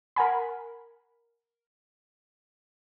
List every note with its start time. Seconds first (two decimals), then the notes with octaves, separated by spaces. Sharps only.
0.16 A#4 F#5 G#5 B5